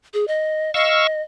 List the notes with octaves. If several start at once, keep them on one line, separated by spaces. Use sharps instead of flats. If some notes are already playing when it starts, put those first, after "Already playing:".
G#4
D#5
D#5 F5 C#6 E6